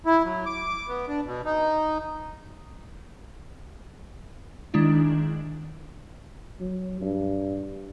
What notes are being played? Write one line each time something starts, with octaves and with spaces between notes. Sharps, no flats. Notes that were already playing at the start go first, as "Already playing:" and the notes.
E4
F#3
D6
B3
D4
B2
D#4
D#3 G#3 D4 E4
F#3
G2